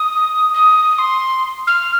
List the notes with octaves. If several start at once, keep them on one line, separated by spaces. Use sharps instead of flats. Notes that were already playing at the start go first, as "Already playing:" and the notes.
Already playing: D#6
D#6
C6
F6